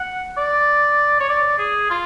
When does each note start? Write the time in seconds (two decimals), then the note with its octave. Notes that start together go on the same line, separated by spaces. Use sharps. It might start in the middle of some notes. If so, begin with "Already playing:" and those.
Already playing: F#5
0.37 D5
1.20 C#5
1.29 D5
1.59 G#4
1.90 F4